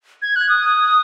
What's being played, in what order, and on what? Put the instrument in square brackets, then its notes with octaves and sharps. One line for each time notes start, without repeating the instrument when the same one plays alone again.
[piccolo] G#6
F#6
D#6